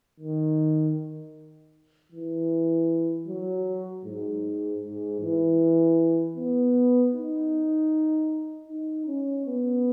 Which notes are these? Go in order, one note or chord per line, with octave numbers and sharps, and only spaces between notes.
D#3
E3
F#3
G#2
G#2
E3
B3
D#4
D#4
C#4
B3